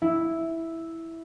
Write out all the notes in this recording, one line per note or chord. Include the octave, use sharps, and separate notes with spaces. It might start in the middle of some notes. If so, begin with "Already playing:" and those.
E4